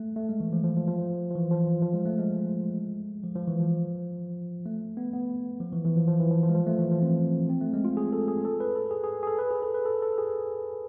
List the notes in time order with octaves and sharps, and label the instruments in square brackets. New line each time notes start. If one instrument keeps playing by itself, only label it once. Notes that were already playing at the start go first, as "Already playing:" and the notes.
Already playing: [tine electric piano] A3
A3
G#3
E3
F3
F3
F3
F3
F3
E3
F3
F3
G#3
A3
G#3
F3
F3
E3
F3
A3
B3
B3
F3
E3
E3
F3
F3
E3
F3
F3
G#3
F3
A3
E3
F3
C4
C4
A3
G#3
F4
G#4
A4
G#4
A4
B4
A4
G#4
G#4
G#4
A4
B4
G#4
A4
B4
A4
A4
G#4